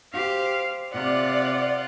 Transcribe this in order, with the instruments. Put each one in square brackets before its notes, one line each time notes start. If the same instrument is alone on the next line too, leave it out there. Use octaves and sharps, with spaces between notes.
[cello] G4 C5 [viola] F5
[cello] C3 [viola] F4 F#5 [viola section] D5